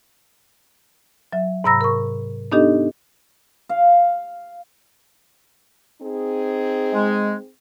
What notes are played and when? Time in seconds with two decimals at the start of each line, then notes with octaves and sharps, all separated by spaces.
1.33 F#3 E5
1.64 G#2 C3 A#5 B5 E6 A#6
1.81 A#4 C#6
2.52 B3 D4 D#4 G4 A4 D#5
3.69 F5
6.02 C4 D#4 G#4
6.93 G#3